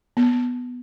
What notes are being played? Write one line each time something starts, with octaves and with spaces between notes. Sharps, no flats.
B3